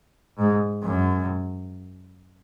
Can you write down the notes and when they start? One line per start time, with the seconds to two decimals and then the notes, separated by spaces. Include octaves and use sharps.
0.38 G#2
0.84 F#2